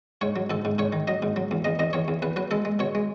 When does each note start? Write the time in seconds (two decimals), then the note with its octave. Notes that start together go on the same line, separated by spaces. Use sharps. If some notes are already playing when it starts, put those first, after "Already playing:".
0.21 G#2 C#5
0.36 F#3
0.50 G#2 A4
0.65 G#2
0.78 G#2 C#5
0.93 D#3
1.07 F#3 D#5
1.22 G#2
1.36 F#3
1.51 E2
1.65 E2 D#5
1.79 E2 D#5
1.93 E2 C#5
2.08 E2
2.22 E2 B4
2.36 F#3 B4
2.51 G#3 A4
2.65 G#3
2.79 B2 C#5
2.95 G#3